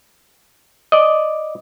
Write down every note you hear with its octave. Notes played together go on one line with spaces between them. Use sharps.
D5 D#5